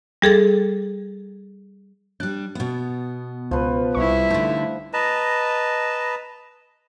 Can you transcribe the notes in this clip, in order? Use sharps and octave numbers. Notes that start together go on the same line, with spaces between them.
G3 G#4 A4 A6
G3 D4 F#6
B2 B3
C#2 F3 B4
C2 G3 E4 C#6
D3 A3 D#4
B4 D#5 A5 A#5